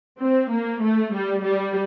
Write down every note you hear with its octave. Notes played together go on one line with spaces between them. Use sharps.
C4
A#3
A3
G3
G3